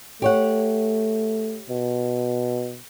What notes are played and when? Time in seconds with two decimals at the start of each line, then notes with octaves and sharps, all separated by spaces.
0.22 A3 G4 C#5 F#5
1.69 B2